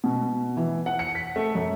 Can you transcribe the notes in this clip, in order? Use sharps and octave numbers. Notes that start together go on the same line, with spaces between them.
B2
E3
F#5
C#7
B6
A3
F#2